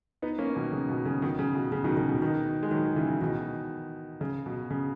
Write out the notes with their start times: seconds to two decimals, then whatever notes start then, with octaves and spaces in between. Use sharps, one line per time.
0.22 B3 D#4
0.38 A#3 C#4
0.56 B2 D#3
0.72 C#3
0.89 B2
1.05 C#3
1.22 B2 D#3
1.39 C#3
1.55 B2
1.72 C#3
1.84 B2 D#3
1.97 C#3
2.09 B2
2.22 B2 D#3
2.63 G#3
2.71 D#3 F#3
2.96 C#3 E3
3.21 B2 D#3
4.21 C#3
4.46 B2
4.70 C#3